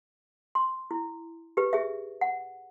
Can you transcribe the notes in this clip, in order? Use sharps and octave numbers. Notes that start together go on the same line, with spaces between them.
C6
E4
G4 B4
G#4 E5
F#5